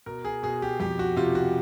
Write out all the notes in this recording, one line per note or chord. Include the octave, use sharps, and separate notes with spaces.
B2 A#4
G#4
B2 G#4
G4
F2 G4
F#4
C3 F4
F#4